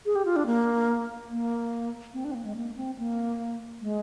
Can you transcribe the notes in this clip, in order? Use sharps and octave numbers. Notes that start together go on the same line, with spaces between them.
G#4
G4
F4
D4
A#3
A#3
C4
D4
C4
A#3
G#3
A#3
C4
A#3
G#3